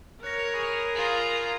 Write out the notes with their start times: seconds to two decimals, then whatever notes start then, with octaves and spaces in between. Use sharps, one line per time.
0.23 A#4 C#5 F#6 A#6
0.54 G#4 B5
0.95 F4 G#4 A#5